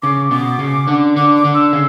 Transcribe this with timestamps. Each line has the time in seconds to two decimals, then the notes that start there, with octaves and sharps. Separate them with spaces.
0.02 C#3 D6
0.31 B2 D6
0.59 C#3
0.88 D3
1.16 D3 D6
1.36 D6
1.45 D3
1.55 E6
1.73 C#3